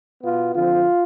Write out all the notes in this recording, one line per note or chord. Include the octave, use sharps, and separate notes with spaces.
B2 B3 F4
D3 F3 C4 F4